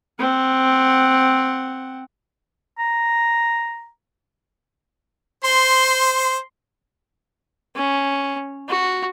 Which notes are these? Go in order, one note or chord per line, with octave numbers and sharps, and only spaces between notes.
C4 F#5
A#5
C5 C6
C#4
F#4